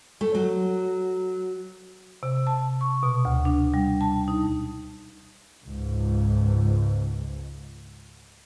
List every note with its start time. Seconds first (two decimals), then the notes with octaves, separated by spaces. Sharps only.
0.21 A3
0.34 F#3
2.23 C3
2.47 A5
2.81 C#6
3.03 B2
3.25 D2
3.45 D4
3.74 G3
4.01 A5
4.28 D#4
5.65 C#2 G#2